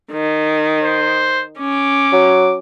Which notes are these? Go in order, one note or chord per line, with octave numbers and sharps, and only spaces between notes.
D#3
C5
C#4 D6
F#3